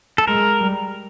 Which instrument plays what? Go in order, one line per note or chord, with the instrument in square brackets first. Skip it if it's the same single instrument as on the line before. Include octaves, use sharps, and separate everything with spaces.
[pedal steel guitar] A4
[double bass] G#3 [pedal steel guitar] A#4
[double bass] G3